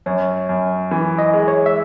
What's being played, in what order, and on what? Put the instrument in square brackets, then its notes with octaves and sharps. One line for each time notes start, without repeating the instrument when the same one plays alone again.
[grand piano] F#2 [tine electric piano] C#5
[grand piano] F#2
E3
[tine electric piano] D#5
[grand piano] G#3
[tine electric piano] C#5
E5